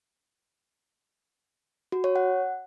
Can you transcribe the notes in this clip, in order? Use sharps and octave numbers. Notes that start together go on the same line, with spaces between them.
F#4
C#5
F#5